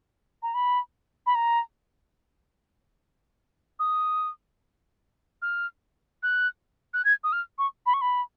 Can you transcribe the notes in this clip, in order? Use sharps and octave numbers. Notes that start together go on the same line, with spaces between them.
A#5
B5
B5
A#5
D#6
F6
F#6
F#6
G#6
D#6
F6
C#6
B5
C#6
B5